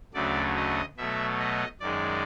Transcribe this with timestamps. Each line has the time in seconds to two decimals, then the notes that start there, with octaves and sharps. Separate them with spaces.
0.14 D2 C#3 F#3 A3 D5
0.56 D#5
0.97 B2 F#3 A3 E5
1.39 D#5
1.80 F#2 D#3 G#3 D5